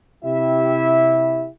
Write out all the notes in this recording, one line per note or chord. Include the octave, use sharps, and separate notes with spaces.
C3 E4 G4 E5